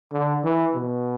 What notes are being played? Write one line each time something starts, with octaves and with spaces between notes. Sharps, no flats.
D3
E3
B2